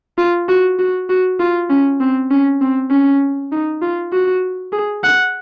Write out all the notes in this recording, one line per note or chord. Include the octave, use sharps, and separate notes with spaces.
F4
F#4
F#4
F#4
F4
C#4
C4
C#4
C4
C#4
D#4
F4
F#4
G#4
F#5